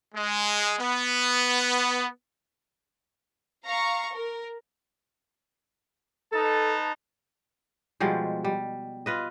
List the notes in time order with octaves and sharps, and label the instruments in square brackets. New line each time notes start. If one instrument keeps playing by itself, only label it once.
[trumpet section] G#3
B3
[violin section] F5 A#5 C#6
A#4
[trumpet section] D#4 B4 A5 [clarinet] A4
[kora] B2 F3 G3 G#3
G3
F4 B4 D#5